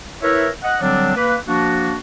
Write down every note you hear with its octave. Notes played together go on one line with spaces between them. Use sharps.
E4 A#4 B4 C#5 E5
D#5 F#5
D3 F#3 G3 C4 D4
A#3 B4
F3 A#3 D4 F#4